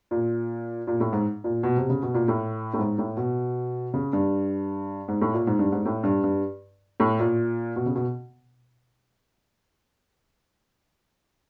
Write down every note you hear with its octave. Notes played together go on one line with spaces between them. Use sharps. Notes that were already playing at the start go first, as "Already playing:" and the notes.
A#2
A#2
A2
G#2
A#2
B2
C3
C#3
B2
A#2
A2
A2
G#2
A2
B2
C#3
G2
G#2
A2
A#2
G#2
G2
G#2
A2
G2
G2
A2
A#2
B2
C#3
B2